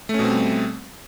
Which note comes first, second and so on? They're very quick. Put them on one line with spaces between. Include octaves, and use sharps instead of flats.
A3 C#4 B2 C4 G3